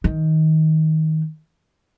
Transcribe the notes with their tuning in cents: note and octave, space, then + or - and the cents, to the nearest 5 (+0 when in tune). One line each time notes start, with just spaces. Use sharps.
D#3 +20